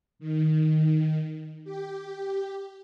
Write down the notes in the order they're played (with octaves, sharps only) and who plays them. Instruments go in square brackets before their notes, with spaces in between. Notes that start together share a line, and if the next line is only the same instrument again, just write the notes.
[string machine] D#3
G4